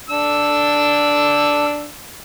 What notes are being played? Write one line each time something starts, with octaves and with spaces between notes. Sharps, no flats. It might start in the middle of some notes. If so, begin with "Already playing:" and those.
D4 E6